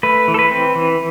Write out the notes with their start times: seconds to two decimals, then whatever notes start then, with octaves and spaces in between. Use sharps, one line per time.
0.03 A3 B4
0.28 E3
0.34 A4
0.39 B4
0.51 C4
0.76 E3